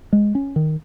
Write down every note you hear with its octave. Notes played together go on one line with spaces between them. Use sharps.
G#3
C#4
D#3